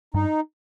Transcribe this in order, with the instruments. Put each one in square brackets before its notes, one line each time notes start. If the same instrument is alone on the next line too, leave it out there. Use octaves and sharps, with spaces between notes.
[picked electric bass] G2 [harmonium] D#4